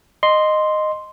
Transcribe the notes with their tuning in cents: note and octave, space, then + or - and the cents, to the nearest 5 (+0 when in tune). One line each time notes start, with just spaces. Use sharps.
D#5 -10 C6 +0